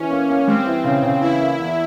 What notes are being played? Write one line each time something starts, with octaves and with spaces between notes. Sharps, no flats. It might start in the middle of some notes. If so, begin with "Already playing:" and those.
Already playing: E3 C#4
A#3
A#3
G3 C4
E3
C#3
C#3
E3 E4
A#3
E2